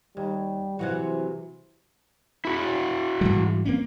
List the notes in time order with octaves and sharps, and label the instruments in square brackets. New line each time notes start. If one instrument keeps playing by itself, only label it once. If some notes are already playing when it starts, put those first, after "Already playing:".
[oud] D#2 [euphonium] G3
[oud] C3 F#3 F#4 [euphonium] E3
[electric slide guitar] E4 F#4
[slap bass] G#2 E3 G3
A#3 C4 C#4